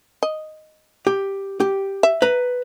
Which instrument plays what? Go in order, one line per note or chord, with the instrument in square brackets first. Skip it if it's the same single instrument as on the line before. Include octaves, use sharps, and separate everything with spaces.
[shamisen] D#5
[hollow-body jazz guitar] G4
G4
[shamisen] E5
[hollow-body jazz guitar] B4 A#5